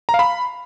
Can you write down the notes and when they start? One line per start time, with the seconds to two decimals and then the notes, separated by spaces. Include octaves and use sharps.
0.09 A#5
0.14 F5
0.19 B5